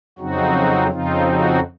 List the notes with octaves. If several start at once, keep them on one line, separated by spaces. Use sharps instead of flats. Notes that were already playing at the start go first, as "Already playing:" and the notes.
F2 C#3 F#3 C4 D#4 F#4
F2 C#3 F3 C4 D#4 F4
F#4